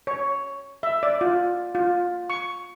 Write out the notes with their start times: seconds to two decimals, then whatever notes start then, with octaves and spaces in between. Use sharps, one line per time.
0.07 C#5
0.83 E5
1.03 D5
1.21 F4
1.75 F4
2.30 C#6